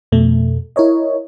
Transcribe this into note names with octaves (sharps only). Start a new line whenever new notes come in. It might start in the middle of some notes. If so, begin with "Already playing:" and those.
F2 B2 A3
E4 A#4 C#5 D#5